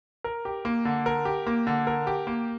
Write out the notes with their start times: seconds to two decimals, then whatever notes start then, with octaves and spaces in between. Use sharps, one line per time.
0.24 A#4
0.45 G4
0.65 A#3
0.85 D3
1.06 A#4
1.25 G4
1.47 A#3
1.67 D3
1.87 A#4
2.07 G4
2.27 A#3